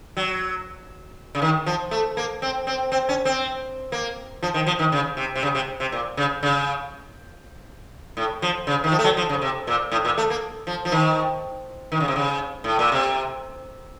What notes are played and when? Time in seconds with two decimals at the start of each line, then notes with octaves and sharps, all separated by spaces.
0.17 F#3
1.35 C#3
1.42 D#3
1.66 F3
1.91 A3
2.17 A#3
2.42 C4
2.67 C4
2.92 C4
3.09 C#4
3.25 C4
3.92 A#3
4.43 F3
4.54 D#3
4.67 F3
4.79 D#3
4.92 C#3
5.17 C3
5.35 C3
5.43 C#3
5.55 C3
5.80 C3
5.92 A#2
6.17 C#3
6.43 C#3
8.17 A2
8.42 F3
8.67 C#3
8.84 D#3
8.92 F3
8.99 A3
9.04 F#3
9.17 F3
9.29 C#3
9.42 C3
9.67 A#2
9.92 A2
10.05 A#2
10.18 A3
10.30 A#3
10.67 F3
10.85 F3
10.92 D#3
11.92 D#3
12.00 C#3
12.08 C3
12.16 C#3
12.64 A2
12.79 A#2
12.92 C3